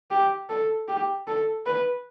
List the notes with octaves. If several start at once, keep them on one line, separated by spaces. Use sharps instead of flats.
G4
A4
G4
A4
B4